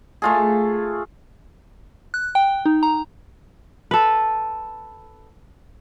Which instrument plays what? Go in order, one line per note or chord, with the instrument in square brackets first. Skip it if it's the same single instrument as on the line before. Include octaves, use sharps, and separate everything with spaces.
[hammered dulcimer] A3 F4 G#4
[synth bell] F#6
G5
D#4
A#5
[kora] A4 B4